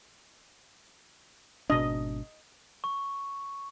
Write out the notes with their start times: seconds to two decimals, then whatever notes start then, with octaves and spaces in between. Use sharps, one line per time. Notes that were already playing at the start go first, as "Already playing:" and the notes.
1.70 G#1 B2 D4 D#5
2.84 C#6